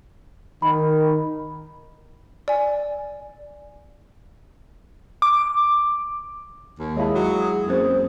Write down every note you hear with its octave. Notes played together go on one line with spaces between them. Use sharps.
D#3 B5
D5 G#5
D6
D#2
G#3 E4 G#4 C#5 F5 A5
F#3
F#2 A#3 C4 C5